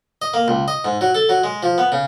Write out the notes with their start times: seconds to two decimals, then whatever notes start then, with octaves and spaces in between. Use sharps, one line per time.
0.22 D#5
0.34 A#3
0.48 C#2
0.68 D#5
0.85 G#2
1.01 F#3
1.15 A4
1.29 F#3
1.44 G#3
1.63 F3
1.78 B3
1.92 C#3